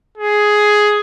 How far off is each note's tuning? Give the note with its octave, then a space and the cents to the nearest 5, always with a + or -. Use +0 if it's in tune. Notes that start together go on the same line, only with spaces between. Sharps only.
G#4 +10